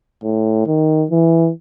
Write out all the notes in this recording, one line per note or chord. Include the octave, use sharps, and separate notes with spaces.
A2
D#3
E3